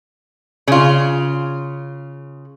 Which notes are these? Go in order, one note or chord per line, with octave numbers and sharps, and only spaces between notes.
C#3 F4